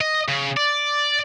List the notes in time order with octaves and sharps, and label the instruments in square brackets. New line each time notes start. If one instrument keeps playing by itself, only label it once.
[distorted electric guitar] D#5
C#3
D5